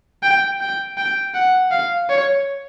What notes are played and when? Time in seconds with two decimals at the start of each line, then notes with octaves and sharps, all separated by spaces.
0.23 G5
0.61 G5
0.98 G5
1.35 F#5
1.71 F5
2.10 C#5